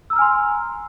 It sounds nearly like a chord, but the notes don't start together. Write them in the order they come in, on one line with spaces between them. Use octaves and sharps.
E6 A#5 F6 G#5 C6